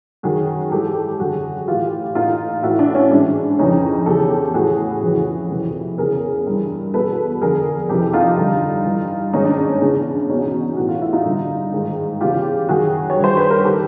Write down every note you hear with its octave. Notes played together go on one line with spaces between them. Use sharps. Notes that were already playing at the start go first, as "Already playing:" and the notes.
F#2 D#3 F#4 G#4
G#2 E3 G4 A4
F#2 D3 F#4 G#4
A2 E3 F4 G4
A2 E3 D#4 F4
A2 E3 E4 F#4
D4
C#4
G#2 E3 D4
F2 C#3 E3 C#4 D#4
E2 C#3 E3 G4 A4
A2 E3 F#4 G#4
F2 C#3 E3
F2 C3 E3
E2 C#3 E3 G#4 A#4
G2 E3
E2 B2 A4 B4
F2 D3 G#4 A#4
F2 C3 E3 G4 A4
D#4 F4
G2 D3
G2 E3
G#2 D#3 C#4 D#4
D4
D4
C#4
E2 C#3 E3 D4
E2 B2 C#4 D#4
A2 E3 F#4
F4
E4
D#4 F4
G2 D3
G#2 D#3
E2 C#3 E3 F4 G4
F#2 D#3 F#4 G#4
C#5
G2 D#3
C5
B4
A#4
D#3 G4 A4